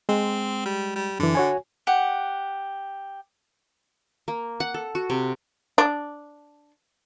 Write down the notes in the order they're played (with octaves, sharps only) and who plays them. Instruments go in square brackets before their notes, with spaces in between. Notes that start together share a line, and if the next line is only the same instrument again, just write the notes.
[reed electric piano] G#3 [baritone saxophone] C4
[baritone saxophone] G3
G3
[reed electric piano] F#2 E3 [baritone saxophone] D3
[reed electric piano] F#4 C#5 G#5
[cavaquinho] G4 F#5
[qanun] A#3
F#5
A4
F#4
C3
[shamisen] D4